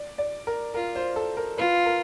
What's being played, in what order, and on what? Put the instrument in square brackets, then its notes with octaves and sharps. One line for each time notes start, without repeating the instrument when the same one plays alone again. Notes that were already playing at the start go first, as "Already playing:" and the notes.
Already playing: [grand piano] D5
D5
A#4
[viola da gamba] F4 [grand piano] A#4
[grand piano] C5
A4
A#4
[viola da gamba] F4 [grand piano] B4
[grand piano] A#4